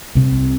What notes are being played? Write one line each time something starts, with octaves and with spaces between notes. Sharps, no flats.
C2 C3